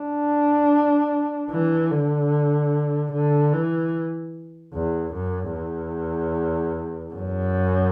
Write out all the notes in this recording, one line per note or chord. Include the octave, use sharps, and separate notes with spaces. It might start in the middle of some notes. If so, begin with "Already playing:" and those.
Already playing: D4
E3
D3
D3
E3
E2
F#2
E2
F#2